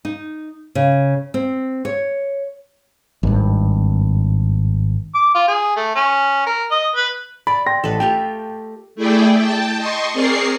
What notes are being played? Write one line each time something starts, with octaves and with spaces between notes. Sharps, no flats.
D#4
C#3
C4
C#5
G#1 G2
D6
F4
G#4
A3
C#4
A#4
D#5
B4
D5 B5
G5 C6 A#6
A1 A4 B4
A3 F4 G4 G5
A3 E4 G#4 D5 G5
G5 A5
D#5 C6 C#6
C4 G#4 A#4 D5 C#6 C7